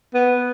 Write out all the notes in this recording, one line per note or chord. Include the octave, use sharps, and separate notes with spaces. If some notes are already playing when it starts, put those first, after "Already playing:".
B3